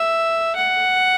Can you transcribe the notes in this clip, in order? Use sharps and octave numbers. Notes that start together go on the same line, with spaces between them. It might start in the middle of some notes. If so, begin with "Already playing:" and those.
Already playing: E5
F#5